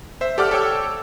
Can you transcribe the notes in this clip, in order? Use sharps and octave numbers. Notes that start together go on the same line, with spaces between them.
C5 E5
G4 A4 D5 F#5 D6 F6
A4 C#5 G5 E6